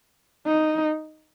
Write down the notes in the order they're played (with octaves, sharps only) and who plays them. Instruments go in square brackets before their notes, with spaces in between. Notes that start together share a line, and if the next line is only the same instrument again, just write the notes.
[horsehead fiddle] D#4